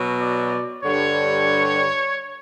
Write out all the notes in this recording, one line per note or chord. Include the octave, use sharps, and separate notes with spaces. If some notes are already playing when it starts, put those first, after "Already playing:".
Already playing: B2 F#3
D5
G2 D3 G3 C#5